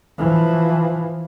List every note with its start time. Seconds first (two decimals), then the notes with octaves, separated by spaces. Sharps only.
0.18 E3 F3